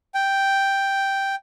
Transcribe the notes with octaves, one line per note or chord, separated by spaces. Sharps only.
G5